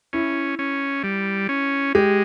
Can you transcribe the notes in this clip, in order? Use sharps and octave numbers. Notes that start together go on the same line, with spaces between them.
C#4 E4
C#4
G3
C#4
G#3 G4